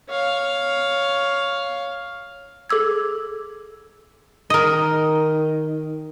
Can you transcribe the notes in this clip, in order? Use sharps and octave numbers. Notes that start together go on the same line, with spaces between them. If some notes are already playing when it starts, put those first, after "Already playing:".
C#5 F5
G#4 A4 D6 E6 G#6
D#3 A#4 D#5